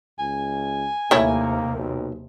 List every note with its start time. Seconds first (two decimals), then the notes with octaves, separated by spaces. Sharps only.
0.19 C#2 G#5
1.11 D#2 C3 A3 A#3 E4 C#5
1.76 B1